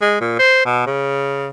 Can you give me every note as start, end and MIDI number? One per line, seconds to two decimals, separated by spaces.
0.01 0.18 56
0.21 0.35 46
0.39 0.61 72
0.66 0.85 47
0.87 1.50 49